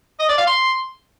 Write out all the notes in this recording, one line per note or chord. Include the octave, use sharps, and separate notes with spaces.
D#5
D5
F5
C6